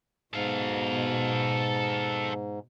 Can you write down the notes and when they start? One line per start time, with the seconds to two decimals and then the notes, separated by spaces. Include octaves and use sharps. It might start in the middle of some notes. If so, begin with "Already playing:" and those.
0.33 G#2 B2 A4 F5